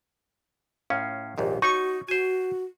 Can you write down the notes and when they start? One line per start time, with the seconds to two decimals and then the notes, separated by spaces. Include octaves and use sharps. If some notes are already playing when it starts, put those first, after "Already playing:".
0.90 A2 C#4 F5
1.38 A#1 D#2 G#2 G4
1.62 D#4 F#4 C#6
2.08 F#4 C5 G#5